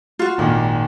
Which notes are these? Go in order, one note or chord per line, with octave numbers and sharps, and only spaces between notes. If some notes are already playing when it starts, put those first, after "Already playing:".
F4 F#4
G#1 A#2 D#3